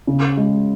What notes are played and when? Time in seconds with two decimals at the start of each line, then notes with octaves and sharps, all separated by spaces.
0.07 C#3
0.37 G#3